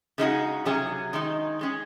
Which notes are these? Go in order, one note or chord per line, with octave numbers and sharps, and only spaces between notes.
C#3 G#3 D#4 F#4
C3 F#3 C#4 G#4
D#3 G#3 D#4
G#3 C#4 G#4